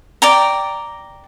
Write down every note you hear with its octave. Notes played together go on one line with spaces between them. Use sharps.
D5 G5 A#5